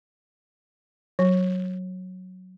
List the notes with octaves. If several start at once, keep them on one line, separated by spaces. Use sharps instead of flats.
F#3